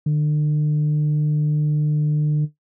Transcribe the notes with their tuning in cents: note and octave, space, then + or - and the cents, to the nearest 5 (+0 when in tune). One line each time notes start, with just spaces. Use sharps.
D3 +40